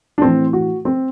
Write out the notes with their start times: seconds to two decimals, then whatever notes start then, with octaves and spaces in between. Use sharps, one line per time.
0.18 D4
0.22 A2 E3 C4
0.53 F#4
0.85 C4